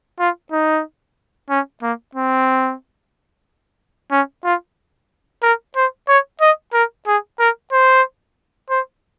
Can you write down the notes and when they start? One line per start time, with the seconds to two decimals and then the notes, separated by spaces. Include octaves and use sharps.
0.19 F4
0.52 D#4
1.50 C#4
1.82 A#3
2.15 C4
4.11 C#4
4.44 F4
5.43 A#4
5.76 C5
6.08 C#5
6.41 D#5
6.73 A#4
7.07 G#4
7.39 A#4
7.72 C5
8.70 C5